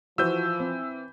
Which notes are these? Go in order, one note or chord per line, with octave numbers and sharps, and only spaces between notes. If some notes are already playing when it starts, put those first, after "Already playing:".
E3 F3 F#4 C5 E6 G6
C4